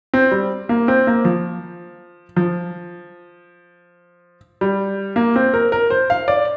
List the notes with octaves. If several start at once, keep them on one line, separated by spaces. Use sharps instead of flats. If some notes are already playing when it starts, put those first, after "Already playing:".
C4
G3
A#3
C4
A#3
F3
F3
G3
A#3
C4
A#4
A#4
C5
F5
D5